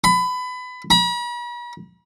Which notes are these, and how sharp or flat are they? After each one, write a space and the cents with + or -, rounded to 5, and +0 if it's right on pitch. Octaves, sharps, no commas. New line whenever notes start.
B5 +25
B5 -45